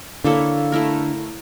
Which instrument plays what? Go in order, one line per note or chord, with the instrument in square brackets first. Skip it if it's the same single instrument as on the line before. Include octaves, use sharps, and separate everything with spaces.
[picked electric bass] D3 [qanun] A#3 E4 A4 C#5
[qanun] A3 E4 A#4